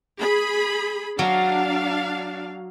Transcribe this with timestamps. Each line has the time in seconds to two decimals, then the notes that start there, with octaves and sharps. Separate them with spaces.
0.19 G#4 B5
1.19 F#3 D4 F5